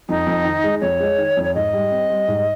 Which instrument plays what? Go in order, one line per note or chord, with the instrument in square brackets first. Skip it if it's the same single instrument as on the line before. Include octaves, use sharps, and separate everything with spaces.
[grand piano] F2 [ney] D#4
[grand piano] F2
D#3
G#3
[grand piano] F2 [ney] C#5
[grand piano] G#3
D#3
F2
[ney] C#5
[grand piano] G#2 [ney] D#5
[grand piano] G3
C4
G3
G#2